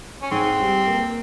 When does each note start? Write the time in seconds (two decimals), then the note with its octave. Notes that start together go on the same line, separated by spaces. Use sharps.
0.22 C#4
0.31 G#2 C4
0.59 G3
0.87 A#3